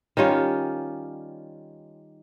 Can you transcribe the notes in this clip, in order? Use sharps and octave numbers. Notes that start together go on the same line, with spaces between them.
D#3 G3 C#4 F4